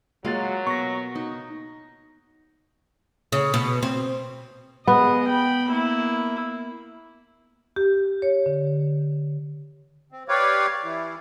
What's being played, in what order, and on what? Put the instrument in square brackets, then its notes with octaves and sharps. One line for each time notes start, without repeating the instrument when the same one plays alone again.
[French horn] F#3 [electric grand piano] G#3 C6 A6 [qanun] A#3 F4 F5
[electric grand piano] B2 [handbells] C#6 A#6
[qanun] D#4
[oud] C#3
B2
C4
[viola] G#3 D#5 [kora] B3
[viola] G5 B5
A#3 E4
[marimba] G4
C#5
D3
[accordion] C4
G4 B4 C#5 D5 F5
E3 E4